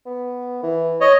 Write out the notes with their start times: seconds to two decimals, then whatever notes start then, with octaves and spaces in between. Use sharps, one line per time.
0.06 B3
0.63 E3
1.01 C#5 D#5